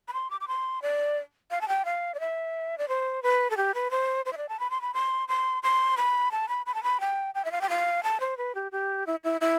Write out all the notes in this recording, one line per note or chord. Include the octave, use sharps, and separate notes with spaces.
B5
C6
D6
D6
C6
D5
F5
A5
G5
F5
D5
E5
D5
C5
B4
A4
G4
B4
C5
C5
E5
D5
A5
B5
C6
B5
C6
C6
C6
B5
A5
B5
B5
A5
B5
G5
G5
E5
F5
G5
F5
A5
C5
B4
G4
G4
E4
E4
E4